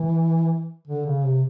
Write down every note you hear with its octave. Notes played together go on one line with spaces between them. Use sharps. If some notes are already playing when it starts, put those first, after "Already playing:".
Already playing: E3
D3
C#3
C3